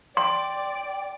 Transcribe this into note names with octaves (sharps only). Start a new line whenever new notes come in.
D5 G5 C6